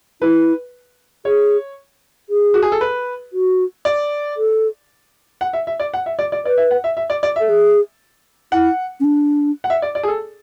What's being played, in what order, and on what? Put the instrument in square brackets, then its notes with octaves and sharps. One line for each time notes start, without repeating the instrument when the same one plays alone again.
[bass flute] E4 [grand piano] B4
[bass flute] G#4 [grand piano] C#5
[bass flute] G#4
[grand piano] F#4
G#4
A4
B4
[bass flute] F#4
[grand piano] D5
[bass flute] A4
[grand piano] F#5
E5
E5
D5
F#5
E5
D5
D5
[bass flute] B4 [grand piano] D5
[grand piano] E5
F#5
E5
E5
D5
D5
[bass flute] A4 [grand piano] E5
[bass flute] G#4
[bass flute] E4 [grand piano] F#5
[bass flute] C#4
D4
[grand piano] F#5
E5
D5
D5
G#4
A4